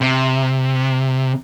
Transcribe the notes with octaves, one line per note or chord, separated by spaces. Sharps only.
C3